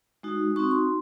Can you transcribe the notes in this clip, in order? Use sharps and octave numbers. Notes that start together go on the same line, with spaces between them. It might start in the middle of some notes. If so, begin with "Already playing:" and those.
G#3 D#4 F#4
C4 D#4 F#4 C#6
C6